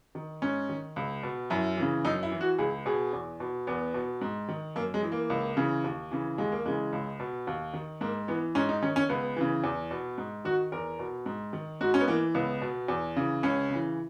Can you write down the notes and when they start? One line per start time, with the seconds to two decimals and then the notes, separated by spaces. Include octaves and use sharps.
0.15 D#3
0.42 G#2 C#4
0.69 D#3
0.96 C#2
1.23 B2
1.50 F#2 E4
1.77 C#3 E3
2.05 F#2 D#4
2.23 E4
2.31 E3
2.41 F#4
2.58 C#2 G#4
2.86 B2 G#4
3.13 E2
3.40 B2
3.67 E2 B3
3.94 B2
4.21 G#2
4.49 D#3
4.76 F#2 A#3
4.94 G#3
5.03 E3
5.12 A#3
5.30 C#2
5.57 C#3 E3
5.84 D#2
6.11 C#3 E3
6.38 D#2 G#3
6.52 A#3
6.65 C#3 E3 G#3
6.93 C#2
7.20 B2
7.47 D#2
7.73 D#3
8.01 G#2 A#3
8.28 E3 B3
8.55 G#2 C#4
8.69 D#4
8.82 D#3 C#4
8.96 C#4
9.09 C#2 B3
9.36 C#3 E3
9.64 E2
9.91 B2
10.18 G#2
10.45 D#3 F#4
10.72 E2 A#4
10.99 B2
11.26 G#2
11.53 D#3
11.81 G#2 F#4
11.94 C#4
12.00 B3
12.08 E3 A#3
12.35 C#2 B3
12.62 B2
12.88 E2
13.16 C#3 E3
13.43 C#2 C#4
13.70 C#3 E3